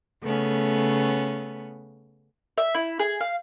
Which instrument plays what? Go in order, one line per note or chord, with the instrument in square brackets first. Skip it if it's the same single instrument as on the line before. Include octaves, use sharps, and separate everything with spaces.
[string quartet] C#3 A3 B3 C#4
[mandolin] E5
E4
G#4
F5